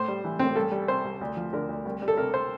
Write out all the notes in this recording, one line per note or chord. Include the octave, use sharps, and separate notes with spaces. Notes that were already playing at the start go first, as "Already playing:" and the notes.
Already playing: A2 C5
G3
E3
A2 C4
C2 A4
G3
C3 C5
C2
D2
F3
D3 A#4
D2
C2
G3
A4
C3 A#4
C5